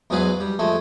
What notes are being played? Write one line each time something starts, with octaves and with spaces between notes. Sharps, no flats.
E2 G#2 F#3 G#4 B4 F5
G3
F2 G#3 A3